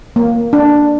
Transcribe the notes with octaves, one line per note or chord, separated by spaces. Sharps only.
A#3
D4